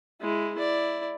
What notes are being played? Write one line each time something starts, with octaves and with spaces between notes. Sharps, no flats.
G#3 E4
E4 D5